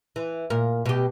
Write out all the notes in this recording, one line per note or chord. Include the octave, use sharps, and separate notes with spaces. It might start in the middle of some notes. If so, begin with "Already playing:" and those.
E3
A#2 A#4
B2 G4